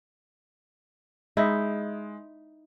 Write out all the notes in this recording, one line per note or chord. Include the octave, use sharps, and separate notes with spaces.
G#3 D#4 E4